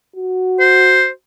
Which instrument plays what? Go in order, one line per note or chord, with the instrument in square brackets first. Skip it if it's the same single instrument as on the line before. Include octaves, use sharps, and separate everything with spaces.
[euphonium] F#4
[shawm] C5